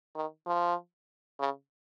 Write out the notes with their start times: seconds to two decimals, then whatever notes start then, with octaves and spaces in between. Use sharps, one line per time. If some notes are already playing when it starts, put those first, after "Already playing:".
0.15 D#3
0.47 F3
1.39 C#3